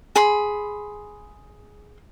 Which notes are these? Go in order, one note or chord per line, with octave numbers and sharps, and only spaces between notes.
G#4 B5 C6